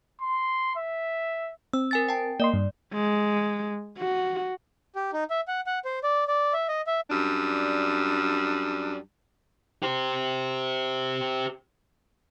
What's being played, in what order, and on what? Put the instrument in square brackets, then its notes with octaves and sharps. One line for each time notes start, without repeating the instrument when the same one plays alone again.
[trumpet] C6
E5
[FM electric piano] C4 [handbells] E6
[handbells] A#4 G#5 A6
G5 A5
[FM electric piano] A#3 D#5 C6 [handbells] D5
[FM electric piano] G2
[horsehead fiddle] G#3
F#4
[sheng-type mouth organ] G4
D#4
E5
F#5
F#5
C5
D5
D5
E5
D#5
E5
[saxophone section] F#2 G3 D4
[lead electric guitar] G4 C5